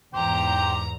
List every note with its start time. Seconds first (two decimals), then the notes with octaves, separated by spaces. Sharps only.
0.14 E2 G#2 G4 C5 G5 A#5